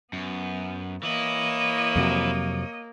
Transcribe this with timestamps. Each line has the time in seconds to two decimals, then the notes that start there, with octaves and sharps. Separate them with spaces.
0.13 F#2 B3
1.03 E3 A#3 E4 C#5 D#5
1.96 F2 C3 F#3